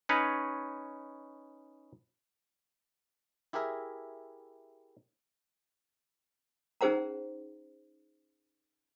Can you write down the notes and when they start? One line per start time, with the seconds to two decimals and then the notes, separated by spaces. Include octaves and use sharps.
0.09 C#4 D#4 B4 C#5
3.53 E4 G4 G#4 A#4 E5
6.81 C#4 D#4 G#4 C5 F#5 A#5